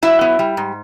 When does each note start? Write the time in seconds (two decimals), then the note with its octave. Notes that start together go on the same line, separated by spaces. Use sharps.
0.03 F#3 E4 E5
0.21 B3
0.39 G3
0.57 G#2